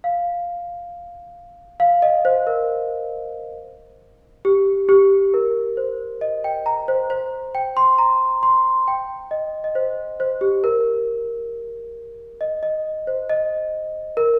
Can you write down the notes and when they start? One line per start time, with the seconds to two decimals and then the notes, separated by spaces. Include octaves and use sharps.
0.04 F5
1.80 F5
2.02 D#5
2.25 C5
2.47 A#4
4.45 G4
4.89 G4
5.34 A#4
5.77 C5
6.21 D#5
6.44 G5
6.66 A#5
6.88 C5
7.10 C5
7.55 G5
7.77 C6
7.98 A#5
8.43 C6
8.88 G5
9.31 D#5
9.64 D#5
9.75 C5
10.20 C5
10.41 G4
10.64 A#4
12.41 D#5
12.63 D#5
13.07 C5
13.29 D#5
14.17 A#4